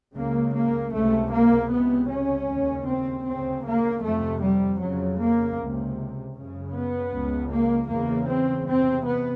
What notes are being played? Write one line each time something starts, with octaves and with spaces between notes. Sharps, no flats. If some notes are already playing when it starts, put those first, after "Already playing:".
C#2 C#3 A#3
A#3
C#2 C3 A3
A#3
C#2 C3 B3
C#4
D#2 C#3
C4
D2 C#3 C4
A#3
F2 C3 A3
G3
F2 C#3 F#3
A#3
C#2 C3
F#2 C#3
B3
C#2 C#3
A#3
E2 C#3 A#3
C4
E2 C3 C4
B3